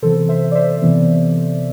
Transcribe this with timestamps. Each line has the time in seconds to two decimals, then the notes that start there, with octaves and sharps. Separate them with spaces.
0.02 C3 E3 B3 A4 C5
0.29 C5 E5
0.51 D5
0.55 C5 E5
0.82 C3 E3 B3